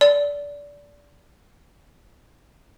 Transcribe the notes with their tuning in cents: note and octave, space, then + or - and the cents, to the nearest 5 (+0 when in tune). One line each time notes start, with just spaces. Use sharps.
D5 -20